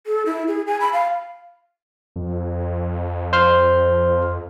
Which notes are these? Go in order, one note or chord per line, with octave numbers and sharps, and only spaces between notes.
A4
E4
G#4
G#5
B5
F5
F2
C5 C6 F6